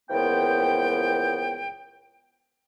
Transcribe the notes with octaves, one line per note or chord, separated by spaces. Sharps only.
C#2 A#2 E3 F3 B3 G5